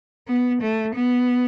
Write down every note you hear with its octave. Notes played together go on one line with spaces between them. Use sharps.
B3
A3
B3